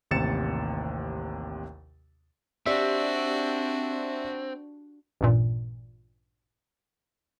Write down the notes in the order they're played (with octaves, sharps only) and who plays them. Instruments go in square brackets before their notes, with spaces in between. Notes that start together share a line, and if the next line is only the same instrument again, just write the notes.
[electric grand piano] A1 D#2 C3 A6 C#7 E7
[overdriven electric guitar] C4 [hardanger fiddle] D4 F#4 [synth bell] G4 D5 [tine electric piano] E5
[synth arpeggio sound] A1 G2 A#2